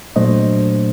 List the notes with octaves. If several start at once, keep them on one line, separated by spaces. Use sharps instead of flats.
A#2 F#3 A3 D4 C5 D#5